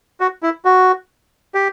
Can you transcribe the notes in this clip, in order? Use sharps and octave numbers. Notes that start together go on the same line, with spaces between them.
F#4
E4
F#4
G4